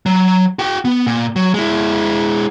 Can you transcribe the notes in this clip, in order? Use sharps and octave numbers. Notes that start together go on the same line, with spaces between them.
F#3
F#4 G5
B3
A#2
F#3
G#3 E4